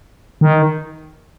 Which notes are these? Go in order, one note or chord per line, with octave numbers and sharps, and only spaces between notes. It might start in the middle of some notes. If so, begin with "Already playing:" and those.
D#3